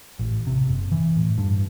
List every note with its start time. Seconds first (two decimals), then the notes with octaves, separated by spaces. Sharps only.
0.19 A1
0.47 C3
0.68 F#1
0.92 E3
1.17 A2
1.38 G2